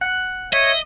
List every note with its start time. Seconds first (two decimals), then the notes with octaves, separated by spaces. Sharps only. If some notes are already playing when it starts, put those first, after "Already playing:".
0.01 F#5
0.53 C#5 D#5 E5